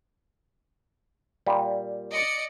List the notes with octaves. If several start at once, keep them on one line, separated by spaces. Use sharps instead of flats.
A#2 G3
D5 D#5 C#7